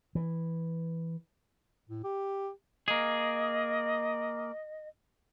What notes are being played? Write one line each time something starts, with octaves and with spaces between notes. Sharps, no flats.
E3
A2
G4
A#3 G#4 D#5